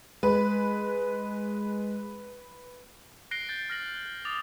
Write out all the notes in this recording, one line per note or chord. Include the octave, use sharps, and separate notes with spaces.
G#3 B4
F#6 A#6 C7 D7 G7
G6 A6
F6 A#6 F#7
D6 D#6 A6 F7